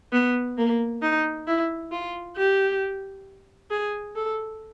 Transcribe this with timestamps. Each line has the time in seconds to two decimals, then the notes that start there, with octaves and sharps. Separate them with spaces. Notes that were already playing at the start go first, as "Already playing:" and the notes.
0.12 B3
0.58 A#3
1.02 D#4
1.47 E4
1.92 F4
2.36 G4
3.70 G#4
4.15 A4